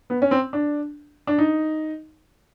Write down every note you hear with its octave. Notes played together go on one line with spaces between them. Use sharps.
B3
C#4
C4
D4
D4
D#4